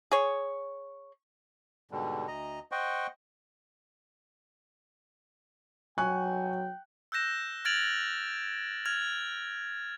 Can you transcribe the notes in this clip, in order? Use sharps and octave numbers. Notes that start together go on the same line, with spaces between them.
G#4 C#5
G#2 B2 D3 G3
D2 D#5 A#5
C5 D#5 F#5 G5 C#6
F#3 G5 G#5 C#6 F#6
E6 F#6 G6 A#6 E7
F6 G#6 A6 D7 F7 F#7
F6 G#6 F7